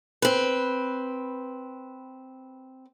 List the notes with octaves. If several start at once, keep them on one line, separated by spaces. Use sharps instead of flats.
C4 B4